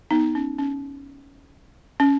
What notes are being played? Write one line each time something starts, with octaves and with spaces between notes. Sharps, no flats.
B3 D#4
C#4
C#4
C#4